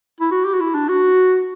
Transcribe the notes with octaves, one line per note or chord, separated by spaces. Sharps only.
E4
F#4
G4
F#4
E4
D4
F#4